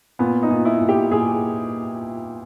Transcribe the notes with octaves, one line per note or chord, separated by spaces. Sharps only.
A#2 B3
D#4
A#2
E4
A#2
G4
A#2 G#4